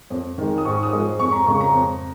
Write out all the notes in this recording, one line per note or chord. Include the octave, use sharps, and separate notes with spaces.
F2
D#3 G#3
D#6
G#2 C#6
D#6
F3 G#3
F2 C#6
A#5
C#3 G#3 C#6
A#5
F2